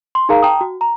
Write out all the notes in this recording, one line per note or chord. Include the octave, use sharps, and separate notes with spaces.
C6
D#4 G#4 A#4 F5 A#5
G5 A5 A#5 D#6
F#4
A#5